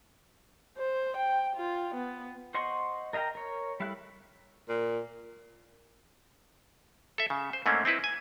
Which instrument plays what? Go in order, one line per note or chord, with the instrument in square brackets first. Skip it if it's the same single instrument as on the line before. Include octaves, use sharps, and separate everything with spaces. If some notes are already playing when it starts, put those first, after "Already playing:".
[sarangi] C5
G5
F4
B3
[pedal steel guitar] C5 D#5 F#5 C6 C#6
A#4 D#5 F5 G5 A#5
A#4 C#5
G3 E4 A4 F5 F#6
[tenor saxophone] A#2
[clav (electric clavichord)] A4 E5
C#3
C5
G#2 A3 A#3 C4 C#4
C4 D#4 E4 B4
G#5